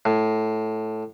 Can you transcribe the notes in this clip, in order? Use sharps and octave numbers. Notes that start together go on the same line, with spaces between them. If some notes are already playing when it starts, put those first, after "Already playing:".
A2